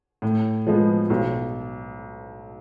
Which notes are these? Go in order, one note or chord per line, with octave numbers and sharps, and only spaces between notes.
A2
F3 G#3 B3
B1